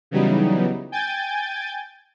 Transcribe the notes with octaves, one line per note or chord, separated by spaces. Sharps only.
C#3 E3 F#3 G3 B3 D#4
G5 G#5 G6 A6